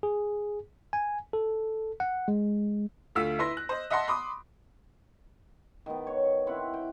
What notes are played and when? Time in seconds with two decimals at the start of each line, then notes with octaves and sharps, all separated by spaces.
0.03 G#4
0.93 G#5
1.33 A4
2.00 F#5
2.28 G#3
3.15 D2 A3 F4 E6 B6
3.39 E4 B4 C6 A#6
3.57 F#6
3.69 C5 D#5
3.90 D#5 E5 F#5 A5 C6
4.07 B5 C6 D6 D#6
5.86 D#3 B3
6.07 C#5
6.47 C4 E4 F#5
6.74 G5